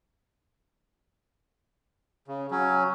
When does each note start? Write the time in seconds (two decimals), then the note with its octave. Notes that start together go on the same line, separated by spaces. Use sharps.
2.28 C#3
2.51 F#3 C#4